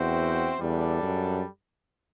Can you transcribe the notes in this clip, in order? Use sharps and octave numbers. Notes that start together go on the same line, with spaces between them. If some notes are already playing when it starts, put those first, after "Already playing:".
Already playing: E2 C4 F#4 C5 E5 G5
E2 G3 D4 A4
F#2